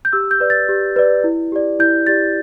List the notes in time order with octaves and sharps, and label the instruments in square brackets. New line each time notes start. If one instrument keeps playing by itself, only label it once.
[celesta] G6
G4 E6
G6
B4 D5
A6
G4
B4 D5
E4
G4 D5
E4 G6
G4 D5 A6